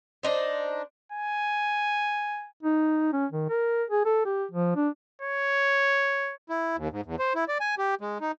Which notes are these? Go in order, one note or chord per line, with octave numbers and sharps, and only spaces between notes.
D4 D#4 C5
G#5
D#4
C#4
D#3
A#4
G#4
A4
G4
F3
D4
C#5
E4
D#2
G#2
E2
C5
E4
D5
G#5
G4
G#3
D#4